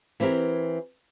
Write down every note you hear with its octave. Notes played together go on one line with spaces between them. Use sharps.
E3 C4 E4 G4 A#4